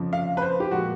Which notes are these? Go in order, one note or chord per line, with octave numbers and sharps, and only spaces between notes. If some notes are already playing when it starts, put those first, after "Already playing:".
Already playing: F2 C#3 F3
F5
B4
C5
G4
A#2 F3 G#3 F#4